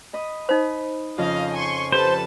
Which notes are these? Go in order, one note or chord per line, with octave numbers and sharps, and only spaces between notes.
D#5 B5 D#6
D#4 C5 D#5 B5
F2 C#3 F3 D#5 F5
G#5 C6 C#6
G4 A4 B4 C5 A5